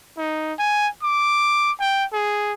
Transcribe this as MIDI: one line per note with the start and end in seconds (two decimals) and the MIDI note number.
0.17 0.53 63
0.59 0.88 80
1.02 1.71 86
1.80 2.05 79
2.13 2.53 68